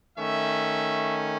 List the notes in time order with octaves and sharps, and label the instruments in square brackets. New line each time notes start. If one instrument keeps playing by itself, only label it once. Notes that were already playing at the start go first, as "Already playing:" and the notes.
[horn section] D#3 A3 C#4 E5